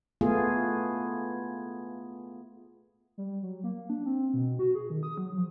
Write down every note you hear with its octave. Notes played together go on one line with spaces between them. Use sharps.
A3 B3 F4 G#4
G3
F#3
A#3
D4
C4
B2
F#4
G#4
D#3
D#6
F#3
F3